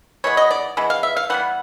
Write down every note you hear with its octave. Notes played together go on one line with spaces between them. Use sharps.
E3 G#3 B3 C#5
D#5
D5
E3 G#3 B3
F5
E5
F5
E3 G3 B3 F#5